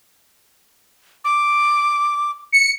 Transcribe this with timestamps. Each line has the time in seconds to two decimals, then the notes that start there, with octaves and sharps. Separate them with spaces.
1.24 D6
2.52 C#7